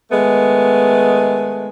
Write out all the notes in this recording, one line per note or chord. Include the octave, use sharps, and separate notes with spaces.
D#3 G#3 A3 B3